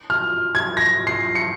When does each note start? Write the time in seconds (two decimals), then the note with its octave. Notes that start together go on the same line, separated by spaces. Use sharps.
0.10 F6
0.55 G#6
0.77 A#6
1.07 C7
1.35 C#7